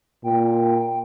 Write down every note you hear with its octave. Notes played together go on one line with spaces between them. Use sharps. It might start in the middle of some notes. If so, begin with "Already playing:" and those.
A#2 G5